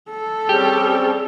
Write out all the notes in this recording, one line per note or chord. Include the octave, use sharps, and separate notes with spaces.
A4
G3 C4 C#4 G4 G#4